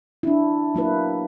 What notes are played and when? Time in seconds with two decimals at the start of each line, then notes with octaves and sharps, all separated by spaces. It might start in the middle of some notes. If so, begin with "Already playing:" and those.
0.23 D4 E4
0.75 F#3 A#3 E4 B4